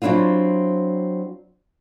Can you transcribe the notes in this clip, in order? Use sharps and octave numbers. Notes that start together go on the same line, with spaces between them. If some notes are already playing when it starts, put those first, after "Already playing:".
F#3 C4 D4 E4 F4